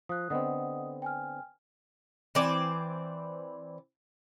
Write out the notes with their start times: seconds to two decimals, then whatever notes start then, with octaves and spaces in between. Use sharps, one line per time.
0.09 F3 D#6 F#6
0.30 D3 B3 C4 D#5 F#5 D#6
1.02 G5 G#5 F6
2.35 E3 C4 D5